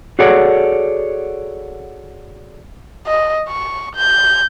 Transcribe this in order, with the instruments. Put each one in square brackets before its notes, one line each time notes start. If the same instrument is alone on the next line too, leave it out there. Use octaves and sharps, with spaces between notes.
[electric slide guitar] F#4 G#4 A4 C#5 D5 F#5
[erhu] D#5
C#6
G6